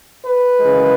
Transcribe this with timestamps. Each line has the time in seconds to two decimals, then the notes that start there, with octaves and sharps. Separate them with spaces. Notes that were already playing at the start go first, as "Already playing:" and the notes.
0.26 B4
0.60 F#2 C#3 E3 G#3